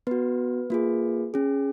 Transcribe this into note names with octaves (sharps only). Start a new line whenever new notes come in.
B3 F#4 B4
A#3 F4 G#4
C#4 G#4